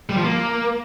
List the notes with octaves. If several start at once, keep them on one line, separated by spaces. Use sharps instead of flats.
G3
F3
A#3